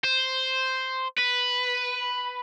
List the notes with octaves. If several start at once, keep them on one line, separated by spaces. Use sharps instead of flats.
C5
B4